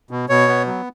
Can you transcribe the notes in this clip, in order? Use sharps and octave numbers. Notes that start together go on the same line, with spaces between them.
B2
B2 C#5
B3
F#3